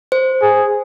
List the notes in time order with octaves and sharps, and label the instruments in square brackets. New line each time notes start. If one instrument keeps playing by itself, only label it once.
[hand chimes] C5
[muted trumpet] G#4